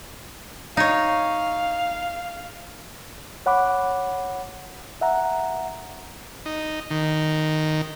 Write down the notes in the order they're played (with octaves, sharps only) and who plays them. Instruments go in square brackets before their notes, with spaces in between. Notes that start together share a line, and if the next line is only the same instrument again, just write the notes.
[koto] D#4 C#5 [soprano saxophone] F5
[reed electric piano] C#5 F#5 B5 D6
E5 F#5 A#5
[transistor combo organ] D#4
D#3